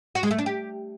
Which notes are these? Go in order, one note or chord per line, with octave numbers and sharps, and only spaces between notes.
F#4
G#3
A3
D4
G4